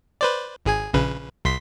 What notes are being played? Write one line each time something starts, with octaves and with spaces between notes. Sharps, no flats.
B4 C5 D5
G#1 G#4 G#5
A#1 C#3 B4
C2 C6 B6